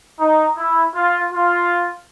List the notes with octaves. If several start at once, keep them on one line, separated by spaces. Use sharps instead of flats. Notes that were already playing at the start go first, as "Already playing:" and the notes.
D#4
E4
F4
F4